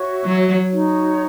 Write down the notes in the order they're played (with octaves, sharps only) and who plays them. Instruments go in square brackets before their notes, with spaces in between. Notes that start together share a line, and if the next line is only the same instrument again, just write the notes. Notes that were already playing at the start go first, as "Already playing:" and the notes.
Already playing: [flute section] F#4 C#5 E5
[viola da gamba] F#3
[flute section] D#4 F#4 C#5